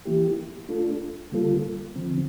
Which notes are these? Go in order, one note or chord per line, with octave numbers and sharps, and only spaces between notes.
E3 A#3 E4 G4
A3 D4 F4 A4
D3 G3 A#3 F4 A4
D3 F3 C4